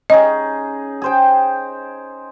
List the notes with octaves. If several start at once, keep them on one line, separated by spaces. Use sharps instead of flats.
C#4 D#4 G#4 D#5
G#4 C5 G5